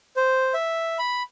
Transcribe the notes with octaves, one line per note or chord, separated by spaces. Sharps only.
C5
E5
B5